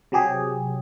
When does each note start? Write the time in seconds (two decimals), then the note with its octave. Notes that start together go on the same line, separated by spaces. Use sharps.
0.12 C3 F#3 G4 G#4